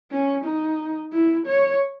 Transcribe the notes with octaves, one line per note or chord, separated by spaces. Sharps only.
C#4
D#4
E4
C#5